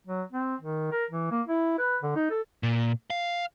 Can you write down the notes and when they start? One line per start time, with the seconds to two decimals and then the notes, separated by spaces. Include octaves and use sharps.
0.07 F#3
0.32 C4
0.61 D#3
0.91 A#4
1.11 E3
1.31 A#3
1.47 E4
1.79 B4
2.03 D3
2.16 D#4
2.30 A4
2.63 A#2
3.10 F5